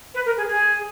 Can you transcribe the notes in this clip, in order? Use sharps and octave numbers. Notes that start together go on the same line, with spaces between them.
B4
A#4
G#4
G#4